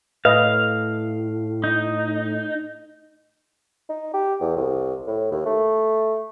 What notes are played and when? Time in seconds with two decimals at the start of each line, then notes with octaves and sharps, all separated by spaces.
0.25 A2 B4 D#5 F5
1.64 D#4
3.89 D#4
4.13 G4
4.40 E2
4.56 C2
5.07 A2
5.32 D#2
5.46 A3